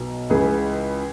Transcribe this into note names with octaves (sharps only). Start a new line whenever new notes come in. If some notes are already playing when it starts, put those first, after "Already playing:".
Already playing: B1 B2
C#2 C#3 E3 G#4